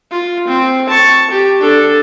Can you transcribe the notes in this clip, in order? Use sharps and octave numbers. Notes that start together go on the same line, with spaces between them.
F4
C4
A5 C#6
G4
D4 A4